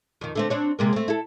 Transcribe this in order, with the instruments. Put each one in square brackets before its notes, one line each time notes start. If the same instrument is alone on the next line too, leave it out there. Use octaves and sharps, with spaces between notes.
[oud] F2 D#3
D3 A3 C4
C4 D4 C#5
C3 G#3 A#3
A3 C4
E4 A4